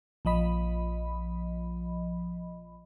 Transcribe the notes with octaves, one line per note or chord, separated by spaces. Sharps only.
A#1 F3 D#5 B5